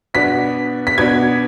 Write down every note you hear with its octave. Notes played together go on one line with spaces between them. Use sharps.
B2 B3 D4 B6
B6
B2 B3 D4 G#6